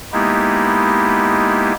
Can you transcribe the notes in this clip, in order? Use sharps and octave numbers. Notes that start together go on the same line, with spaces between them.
G#3 A#3 B3 D#4 E4 G4